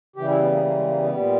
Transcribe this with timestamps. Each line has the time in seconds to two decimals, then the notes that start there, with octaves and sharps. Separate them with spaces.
0.16 C#3 E3 G3 G4
0.28 E4
0.40 B3
0.52 A#3
0.63 A#3
0.75 G#3
0.87 A#3
0.99 B3
1.11 A#2 G3